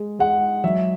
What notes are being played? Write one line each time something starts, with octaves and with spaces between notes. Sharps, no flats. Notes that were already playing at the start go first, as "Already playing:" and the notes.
Already playing: G#3
G#3 F#5
F#3 E5